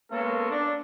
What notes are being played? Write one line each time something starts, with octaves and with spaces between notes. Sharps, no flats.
G#3 A#3 B3 C#4 A4 A#4
D4